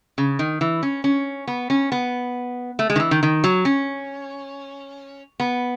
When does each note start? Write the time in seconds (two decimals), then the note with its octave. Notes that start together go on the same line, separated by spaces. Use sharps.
0.18 C#3
0.39 D#3
0.61 E3
0.83 C#4
1.04 C#4
1.47 B3
1.70 C#4
1.92 B3
2.79 A3
2.90 G#3
2.96 D#3
3.00 E3
3.11 D#3
3.23 D#3
3.44 F#3
3.65 C#4
5.40 B3